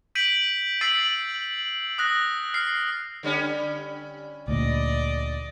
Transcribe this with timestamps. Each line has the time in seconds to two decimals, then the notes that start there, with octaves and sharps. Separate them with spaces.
0.15 G6 B6 D7 D#7 F#7
0.81 E6 A6 B6 C7 D#7 F#7
1.98 D#6 F#6 A#6
2.54 F6 C7
3.23 D3 G3 C#4
4.48 D2 A#2 D5 D#5